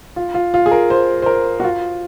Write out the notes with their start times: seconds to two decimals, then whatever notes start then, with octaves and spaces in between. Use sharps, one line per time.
0.16 F4
0.34 F4
0.54 F4
0.66 G#4
0.71 A#4
0.90 C5
1.22 C5
1.26 A#4
1.60 F#4
1.64 F4